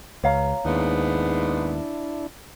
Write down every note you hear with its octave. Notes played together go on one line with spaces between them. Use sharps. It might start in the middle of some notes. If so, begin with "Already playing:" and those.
C#2 C#5 F5 A#5
D#2 G#2 B3 D4 E4